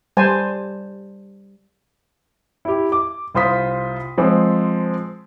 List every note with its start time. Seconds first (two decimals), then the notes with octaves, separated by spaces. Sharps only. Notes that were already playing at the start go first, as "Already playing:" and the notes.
0.17 G3 C5 G#5 A5
2.65 E4 G4
2.92 D6
3.35 C2 F4 C5 D#6 B6
4.18 F3 G#3 C4